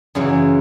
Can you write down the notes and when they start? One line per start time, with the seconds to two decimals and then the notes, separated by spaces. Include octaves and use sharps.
0.15 F#2 C#3 E3